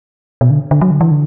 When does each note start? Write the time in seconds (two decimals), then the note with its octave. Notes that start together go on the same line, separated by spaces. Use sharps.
0.41 B2
0.50 D3
0.71 D3
0.81 F#3
0.91 D3
1.01 E3
1.11 D3